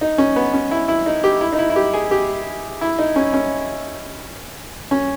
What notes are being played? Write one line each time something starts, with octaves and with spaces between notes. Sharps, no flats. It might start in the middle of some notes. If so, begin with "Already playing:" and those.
D#4
C#4
B3
C#4
E4
E4
D#4
G4
E4
D#4
E4
E4
G4
G#4
G4
E4
D#4
C#4
C#4
C#4